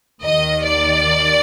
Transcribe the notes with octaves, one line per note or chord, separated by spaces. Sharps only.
D#2 D#3 D#5
D5